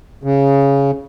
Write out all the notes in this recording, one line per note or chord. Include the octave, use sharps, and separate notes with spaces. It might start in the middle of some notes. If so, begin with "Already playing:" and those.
C#3